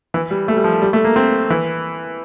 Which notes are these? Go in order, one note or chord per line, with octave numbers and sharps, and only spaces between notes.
E3
G3
A3
G3
F3
G3
A3
A#3
C4
E3